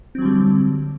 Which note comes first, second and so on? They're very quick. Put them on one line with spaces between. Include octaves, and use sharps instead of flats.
C4 F#3 D3 G3